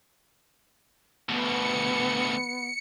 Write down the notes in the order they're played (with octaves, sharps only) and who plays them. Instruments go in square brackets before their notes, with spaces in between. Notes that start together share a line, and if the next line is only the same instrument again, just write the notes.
[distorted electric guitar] D2 B2 [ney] B3 [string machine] C#7